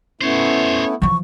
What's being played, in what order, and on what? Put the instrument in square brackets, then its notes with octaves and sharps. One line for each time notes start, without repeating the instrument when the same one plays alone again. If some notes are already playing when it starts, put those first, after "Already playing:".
[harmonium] A3 B3 E4 [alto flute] C#4 [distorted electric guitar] C5 C#5
[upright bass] E3 F3 [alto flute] C#6